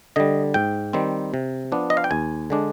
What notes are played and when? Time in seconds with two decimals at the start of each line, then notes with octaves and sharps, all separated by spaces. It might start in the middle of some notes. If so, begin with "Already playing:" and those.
0.16 D3 G3 D#5
0.54 G#2 G5
0.93 D#3 G3 C4
1.34 C3
1.72 F3 B3 D4
1.90 D#5
1.97 F5
2.04 G5
2.11 D#2 G#5
2.50 D3 G#3 D4